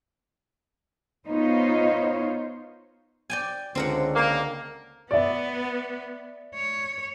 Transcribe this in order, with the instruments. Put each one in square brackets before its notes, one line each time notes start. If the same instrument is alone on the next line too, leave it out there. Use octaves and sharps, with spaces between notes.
[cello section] B3 D#4 F4 C5 C#5
[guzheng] D5 G5 G#5
[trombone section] C#2 D3 [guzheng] C4 A#4 F#5
[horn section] A#3
[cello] B3 [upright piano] D5 E5
[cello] C#5